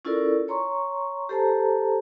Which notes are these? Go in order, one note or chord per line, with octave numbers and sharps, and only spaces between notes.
C#4 E4 F4 A4 A#4 D5
C#5 A#5 C6 C#6
G4 A4 C5 A5 A#5